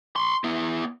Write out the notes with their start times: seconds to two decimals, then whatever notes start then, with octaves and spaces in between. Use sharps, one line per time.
0.16 B5 C6
0.44 B3 E4